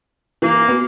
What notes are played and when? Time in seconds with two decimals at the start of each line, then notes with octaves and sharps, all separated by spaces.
0.42 E3 A#3
0.68 B3 F#4